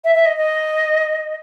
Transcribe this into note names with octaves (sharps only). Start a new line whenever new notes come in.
E5
E5
D#5
D#5